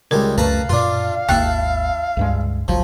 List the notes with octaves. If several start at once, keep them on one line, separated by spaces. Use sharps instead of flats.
C#2 G3 G#3 A#4
C#2 F#2 A3 B4 F5 A5 A#5
F#2 A#2 D4 F4
G#1 D#2 A#3 E4 G5 A5 F#6
C#2 G2 G#3
G1 C#2 F3 F#3